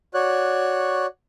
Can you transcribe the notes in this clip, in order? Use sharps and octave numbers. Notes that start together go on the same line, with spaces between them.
F#4 C#5 D5 F#6